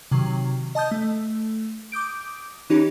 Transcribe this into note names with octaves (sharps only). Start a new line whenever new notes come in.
C3 D#3 F#3
D#5 A5 D#6 G6
A3
D6 D#6 G6 D7
E3 C#4 D#4 G4